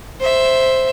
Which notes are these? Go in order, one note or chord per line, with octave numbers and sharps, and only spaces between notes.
C5 E5